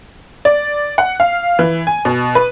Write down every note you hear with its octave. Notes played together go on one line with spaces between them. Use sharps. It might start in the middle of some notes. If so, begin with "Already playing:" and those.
D5
F#5
F5
E3
G#5
B2
B4